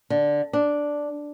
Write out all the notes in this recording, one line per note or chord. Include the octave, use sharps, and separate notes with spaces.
D3
D4